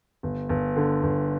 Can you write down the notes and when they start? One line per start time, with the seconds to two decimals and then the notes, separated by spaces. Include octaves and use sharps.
0.23 G1
0.49 G1
0.76 D3
1.03 G1